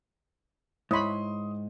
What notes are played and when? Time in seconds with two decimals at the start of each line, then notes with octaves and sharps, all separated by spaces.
0.91 G#2 E4 C#5 B5 C6 D#6